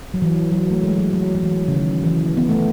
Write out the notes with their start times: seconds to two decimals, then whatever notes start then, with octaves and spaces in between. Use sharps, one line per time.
0.14 F#3
0.22 E3
0.52 F#3
0.71 A3
0.83 G#3
0.97 F#3
1.13 F#3
1.35 F#3
1.43 E3
1.68 C#3
1.73 D#3
2.04 E3
2.37 B3
2.49 A3